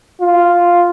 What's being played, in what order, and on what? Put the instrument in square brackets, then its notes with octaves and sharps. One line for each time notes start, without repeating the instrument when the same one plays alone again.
[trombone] F4